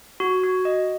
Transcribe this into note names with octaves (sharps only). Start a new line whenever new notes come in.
F#4
F#4
D#5